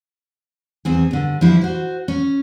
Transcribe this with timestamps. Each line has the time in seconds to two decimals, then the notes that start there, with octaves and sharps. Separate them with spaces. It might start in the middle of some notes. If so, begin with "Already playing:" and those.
0.85 E2 C4 G#4
1.11 G2 D3
1.41 F3 G3 D4 E4
1.61 F#4 C5
2.08 C#4